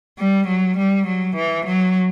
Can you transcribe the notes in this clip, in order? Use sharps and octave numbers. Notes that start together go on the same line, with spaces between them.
G3
F#3
G3
F#3
E3
F#3